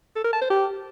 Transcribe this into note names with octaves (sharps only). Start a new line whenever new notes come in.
A4
A#4
A5
C5
G4